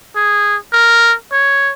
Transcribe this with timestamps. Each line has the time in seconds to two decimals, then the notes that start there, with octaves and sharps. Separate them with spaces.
0.16 G#4
0.73 A#4
1.32 C#5